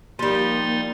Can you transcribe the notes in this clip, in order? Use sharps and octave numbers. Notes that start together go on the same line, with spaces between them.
F3 G3 A#3 D#4 C6 A6